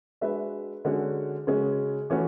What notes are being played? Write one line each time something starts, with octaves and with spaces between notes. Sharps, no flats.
G#3 D4 F#4 B4 E5
D3 G#3 C#4 F#4
C#3 G#3 C#4 F#4
E3 A3 C#4 F#4